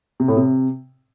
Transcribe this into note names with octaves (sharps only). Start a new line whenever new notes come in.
C3
A2
C3